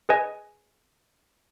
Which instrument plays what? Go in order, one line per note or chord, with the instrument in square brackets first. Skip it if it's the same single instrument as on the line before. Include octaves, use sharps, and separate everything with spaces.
[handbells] G#4 B4 D#5 G#5